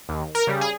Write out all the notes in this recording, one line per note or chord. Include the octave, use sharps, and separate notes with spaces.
D#2
A#4
C#3 G3
G#4